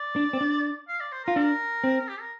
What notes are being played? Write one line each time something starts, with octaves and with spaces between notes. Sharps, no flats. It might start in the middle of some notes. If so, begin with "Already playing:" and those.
Already playing: D5
D4
C4
D4
F5
D5
C5
A#4
F4
D4 A#4
C4
G4
A#4